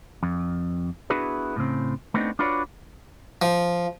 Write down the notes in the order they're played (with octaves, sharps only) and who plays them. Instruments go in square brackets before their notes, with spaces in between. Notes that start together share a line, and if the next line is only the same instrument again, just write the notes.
[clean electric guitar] F2
B3 D4 E4 F#4 G#4 B4
A2 C#3 C4
A3 B3 C4 D4 D#4
D4 F4 F#4 B4 C#5 D5
[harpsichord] F3